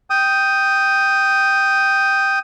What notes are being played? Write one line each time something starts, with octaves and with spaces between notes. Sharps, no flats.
G5 D#6